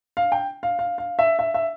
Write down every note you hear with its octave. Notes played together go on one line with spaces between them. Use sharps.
F5
G5
F5
F5
F5
E5
E5
E5